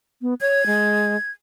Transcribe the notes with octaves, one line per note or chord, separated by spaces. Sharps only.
B3
C#5 G#6
G#3